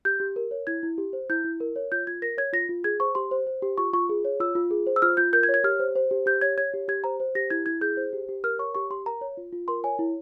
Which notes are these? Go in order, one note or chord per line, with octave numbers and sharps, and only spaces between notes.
G4 G6
G4
A#4
C#5
E4 G#6
E4
G4
C5
E4 G6
E4
A#4
C#5
F4 G6
F4 G#6
A#4 A#6
C#5 G#6
F4 A#6
F4
G#4 G#6
C5 C#6
G4 C6
C5
C5
G4
F4 C#6
F4 C#6
G#4
C#5
F4 E6
F4
G#4
C5
E6
F4 F6
F4 G6
A#4 G6
G#6
C#5
G#6
G4 F6
C5
C5
G4
G4 G6
C#5 G#6
C#5 G#6
G4
G4 G#6
C5 A#5
C5
G4 A#6
E4 G#6
E4 G#6
G#4 G6
C5
G4
G4
A#4 F6
C#5 C#6
G4 C#6
G4 C6
A#4 A#5
C#5
F4
F4
A#4 C6
C#5 G#5
E4